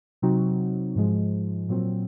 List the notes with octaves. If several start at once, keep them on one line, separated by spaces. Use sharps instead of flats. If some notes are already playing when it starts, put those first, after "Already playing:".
C3 F#3 C4 D#4 F#4
G#2 F3 G#3
A#2 F#3 C4